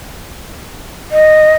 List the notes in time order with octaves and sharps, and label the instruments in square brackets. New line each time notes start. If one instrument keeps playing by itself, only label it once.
[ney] D#5